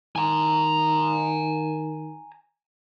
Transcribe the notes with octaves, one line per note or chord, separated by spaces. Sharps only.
D#3 G#5 A#5